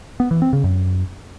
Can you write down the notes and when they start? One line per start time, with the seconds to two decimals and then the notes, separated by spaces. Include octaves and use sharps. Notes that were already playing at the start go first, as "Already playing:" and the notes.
0.20 B3
0.31 E3
0.42 C4
0.53 C#3
0.64 F#2